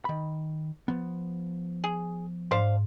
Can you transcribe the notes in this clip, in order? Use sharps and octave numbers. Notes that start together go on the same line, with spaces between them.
D#3 B5
F3 B3
G#4
G#2 D4 C5 F5